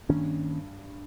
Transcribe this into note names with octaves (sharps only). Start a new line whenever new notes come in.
G2 D#3 A#3 C#4